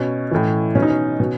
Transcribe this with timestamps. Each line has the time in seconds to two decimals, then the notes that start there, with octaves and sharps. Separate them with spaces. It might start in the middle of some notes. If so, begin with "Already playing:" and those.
Already playing: B2 C#4
0.31 A2 E3
0.75 B2 C#4
0.82 D#4
0.89 C#4
1.20 B2